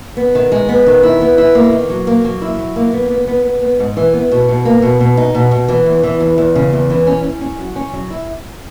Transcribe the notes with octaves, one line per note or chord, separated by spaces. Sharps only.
B3
D#3
G#3
B3
D#3
E4
B3
E4
A#3
D#3
F#3
A#3
F#3
E4
F#3
A#3
B3
B3
B3
B3
B3
G#2
E3
B3
B2
B2
A#3
B2
B2
D#4
B2
B2
E3
E2
E3
E2
E2
C#3
E2
E3
C#4
C#4
C#4
F#3
C#4
F#3
E4